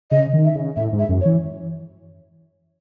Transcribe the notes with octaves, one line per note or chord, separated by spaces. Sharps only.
C#3 D#5
D#3
E5
C#3
A2 E5
G#2
E5
F#2
C#5
E3